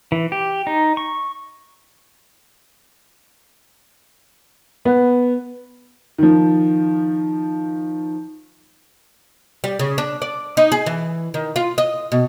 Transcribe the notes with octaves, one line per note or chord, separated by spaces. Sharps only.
E3
G4
D#4
C#6
B3
D#3 F3
G3
C#3
D4
D5
D#4
G#4
E3
D#3
F4
D#5
B2